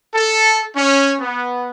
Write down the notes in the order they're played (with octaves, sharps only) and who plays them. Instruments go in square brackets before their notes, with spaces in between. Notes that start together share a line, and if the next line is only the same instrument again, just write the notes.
[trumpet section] A4
C#4
B3